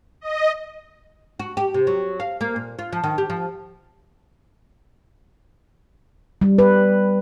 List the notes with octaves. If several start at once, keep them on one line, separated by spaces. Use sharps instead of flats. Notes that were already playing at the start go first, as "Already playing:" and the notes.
D#5
F#4
G4
C3
F#3
F5
A#3
A#2
F4
F3
D#3
G4
F3
G3
B4